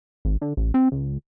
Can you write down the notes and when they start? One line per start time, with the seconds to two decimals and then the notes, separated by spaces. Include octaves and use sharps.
0.25 G#1
0.41 D3
0.57 A1
0.74 C4
0.92 C#2